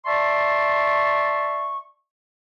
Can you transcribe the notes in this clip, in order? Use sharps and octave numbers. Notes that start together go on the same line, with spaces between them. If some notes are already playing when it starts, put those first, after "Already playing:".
D5 E5 A5 C6 C#6